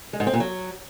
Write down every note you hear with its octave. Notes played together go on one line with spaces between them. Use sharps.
G#3
G#2
C4
A#2
F#3